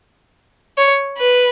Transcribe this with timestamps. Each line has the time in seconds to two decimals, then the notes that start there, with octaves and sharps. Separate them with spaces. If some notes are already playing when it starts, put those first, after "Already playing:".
0.78 C#5
1.18 B4